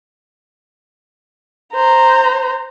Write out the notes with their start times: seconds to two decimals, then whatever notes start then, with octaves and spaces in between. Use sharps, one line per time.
1.74 C5 A#5